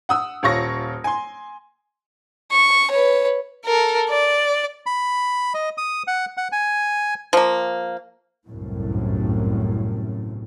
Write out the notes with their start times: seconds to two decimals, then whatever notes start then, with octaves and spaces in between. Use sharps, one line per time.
0.09 F#5 D#6 E6
0.43 D#1 F4 C#5 C#6 A#6
1.04 G#5 C6
2.51 C#6
2.90 B4 C#5
3.66 A4 A#4
4.10 D5
4.86 B5
5.54 D#5
5.78 D#6
6.07 F#5
6.37 F#5
6.52 G#5
7.33 F3 A#3
8.47 G1 C2 F#2 A2